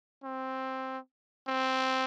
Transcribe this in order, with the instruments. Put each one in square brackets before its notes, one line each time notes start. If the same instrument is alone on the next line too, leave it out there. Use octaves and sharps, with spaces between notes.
[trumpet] C4
C4